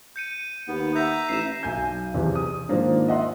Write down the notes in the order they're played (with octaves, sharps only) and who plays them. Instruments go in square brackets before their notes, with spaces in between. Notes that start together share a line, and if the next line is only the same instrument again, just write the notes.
[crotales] G6 C#7 D#7
[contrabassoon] D#2 [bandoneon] B3
[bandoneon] E5 A#5 [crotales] G6
[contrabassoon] A1 [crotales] C7 E7
[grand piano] B1 G#5 G6
E2 C3
D#6
G#2 D#3 F3 A#3 D4
D#5 E5 F#5 C6